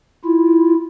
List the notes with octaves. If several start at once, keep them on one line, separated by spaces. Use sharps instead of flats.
E4 F4